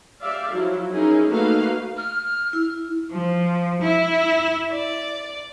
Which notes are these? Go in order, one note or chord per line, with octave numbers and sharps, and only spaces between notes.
G4 D5 E5 F5
F3 F#3 E4
C#4 D#4 E4 G#4 A#4
A3 A#3 D#4 F#4 B4 F5
F6
E4
F3
E4
D5